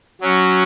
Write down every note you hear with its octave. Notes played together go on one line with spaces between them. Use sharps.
F#3 C#4 F#4